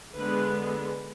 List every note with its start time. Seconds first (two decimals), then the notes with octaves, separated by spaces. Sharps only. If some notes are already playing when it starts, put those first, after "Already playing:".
0.16 D3 G#3 B3 B4